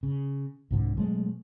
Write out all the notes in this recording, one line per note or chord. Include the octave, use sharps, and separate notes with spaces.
C#3
C2 G#2 D3
B2 F#3 G#3 A3